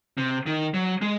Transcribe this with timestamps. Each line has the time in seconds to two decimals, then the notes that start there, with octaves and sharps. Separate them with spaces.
0.18 C3
0.46 D#3
0.74 F#3
1.02 G#3